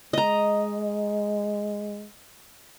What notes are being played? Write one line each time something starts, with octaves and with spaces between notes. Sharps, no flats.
G#3 D#5 A#5